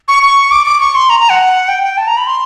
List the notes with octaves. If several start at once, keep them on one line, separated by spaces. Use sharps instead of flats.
C#6
C#6
D6
D6
C#6
C6
A#5
A#5
F#5
G5
G5
A5
A#5
B5
C6